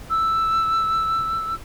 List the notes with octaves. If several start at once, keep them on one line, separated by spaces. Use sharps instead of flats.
E6